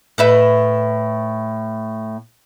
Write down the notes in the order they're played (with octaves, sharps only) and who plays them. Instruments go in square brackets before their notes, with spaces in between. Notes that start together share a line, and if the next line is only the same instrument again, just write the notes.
[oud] A2 B4 E5